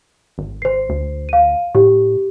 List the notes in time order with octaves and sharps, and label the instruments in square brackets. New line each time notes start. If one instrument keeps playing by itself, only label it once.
[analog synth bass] G#1
[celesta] C5 C7
[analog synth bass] D2
[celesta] F5 D#7
[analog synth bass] A2 [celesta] G4